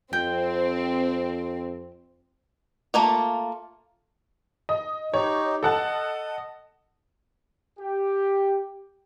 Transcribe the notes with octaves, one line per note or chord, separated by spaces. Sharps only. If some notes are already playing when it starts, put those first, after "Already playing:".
F2 C4 G5
A3 A#3 F4
D#5
D#4 G4 C#5
A4 D#5 F#5 A5
G4